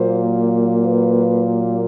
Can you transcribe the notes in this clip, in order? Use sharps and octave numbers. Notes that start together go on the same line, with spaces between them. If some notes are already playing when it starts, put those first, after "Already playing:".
Already playing: A#2 F#3 A#3 C5
B4